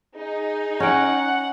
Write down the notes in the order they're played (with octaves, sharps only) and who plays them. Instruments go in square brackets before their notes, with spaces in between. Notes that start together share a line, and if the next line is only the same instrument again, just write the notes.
[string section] D#4 [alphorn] G#4
[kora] C#4 G5 [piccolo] F#5